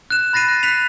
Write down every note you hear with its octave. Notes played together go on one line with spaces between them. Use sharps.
F#6 E7
B5 A6 A#6 C7 D#7
F#6
F#6 B6 C#7 F7